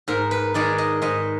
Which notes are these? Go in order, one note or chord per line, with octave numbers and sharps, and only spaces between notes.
G#2 A#4
B4
D#3 G#3 D#4 D5
D#5
G#2 D#5